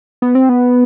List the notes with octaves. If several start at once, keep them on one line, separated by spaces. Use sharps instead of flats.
B3
C4
B3